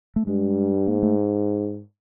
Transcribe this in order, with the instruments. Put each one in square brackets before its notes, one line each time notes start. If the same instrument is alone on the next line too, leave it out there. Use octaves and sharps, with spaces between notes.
[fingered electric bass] A3
[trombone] G2 [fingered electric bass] G#3
[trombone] G#2 [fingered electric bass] A#3
[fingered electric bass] A3